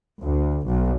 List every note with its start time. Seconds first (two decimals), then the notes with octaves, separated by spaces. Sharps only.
0.20 D2
0.65 B1